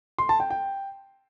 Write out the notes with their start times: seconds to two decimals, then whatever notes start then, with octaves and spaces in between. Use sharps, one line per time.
0.18 C6
0.29 A5
0.40 G5
0.50 G5